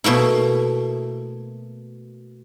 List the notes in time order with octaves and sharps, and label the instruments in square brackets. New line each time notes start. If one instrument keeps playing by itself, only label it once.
[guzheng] B2 A3 A#3 E4